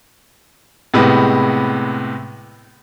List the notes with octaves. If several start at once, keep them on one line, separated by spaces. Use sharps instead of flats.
A2 C3 G#3 B3